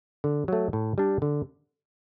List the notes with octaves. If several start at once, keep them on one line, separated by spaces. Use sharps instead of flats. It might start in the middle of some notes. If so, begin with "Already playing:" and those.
D3
F#3 A3
A2
G3 D4
D3